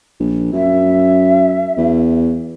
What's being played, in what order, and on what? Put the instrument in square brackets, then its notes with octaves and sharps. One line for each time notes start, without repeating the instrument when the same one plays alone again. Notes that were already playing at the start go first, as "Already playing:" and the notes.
[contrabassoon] A#1
[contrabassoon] F#2 [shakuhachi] E5
[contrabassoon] E2